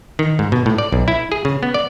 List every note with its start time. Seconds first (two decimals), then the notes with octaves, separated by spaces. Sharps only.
0.19 D#3
0.39 G#2
0.52 B2
0.66 A2
0.78 D5
0.92 B1
1.08 E4
1.32 G#4
1.45 C#3
1.63 B3
1.74 D5